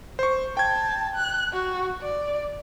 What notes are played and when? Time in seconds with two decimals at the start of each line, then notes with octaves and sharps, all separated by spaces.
0.19 C5 C#6
0.57 G5 A5 G#6
1.16 F#6
1.53 F#4
2.02 D5